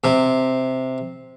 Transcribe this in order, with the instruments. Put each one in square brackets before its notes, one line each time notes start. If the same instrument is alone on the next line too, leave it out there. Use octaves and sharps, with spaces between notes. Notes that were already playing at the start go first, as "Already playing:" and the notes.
[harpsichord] C3